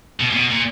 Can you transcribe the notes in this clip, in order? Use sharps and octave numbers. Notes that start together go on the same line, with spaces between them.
B2
A#2
B2
A#2